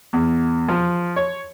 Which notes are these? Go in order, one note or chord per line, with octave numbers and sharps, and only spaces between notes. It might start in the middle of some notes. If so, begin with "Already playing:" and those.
E2
F3
C#5